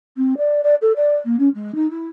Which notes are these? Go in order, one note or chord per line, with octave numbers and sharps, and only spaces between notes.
C4
D5
D5
A4
D5
A#3
C#4
G#3
D#4
E4